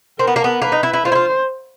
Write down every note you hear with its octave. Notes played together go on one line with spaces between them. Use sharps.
C4 A#4
B3
A#3
B3
A#3 B4
D#4
E4
E4
F4 C5
E4
F4